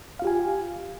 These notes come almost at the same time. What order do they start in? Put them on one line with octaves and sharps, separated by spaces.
F5 F4 G4 G#5